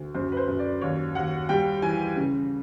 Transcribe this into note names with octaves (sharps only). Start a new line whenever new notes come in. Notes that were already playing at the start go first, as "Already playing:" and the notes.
Already playing: D2
F#2 C5
B4
C5
F#2
D5
D#2 C#5
D#2 F#5
G3 G5
E3 G#5
C#3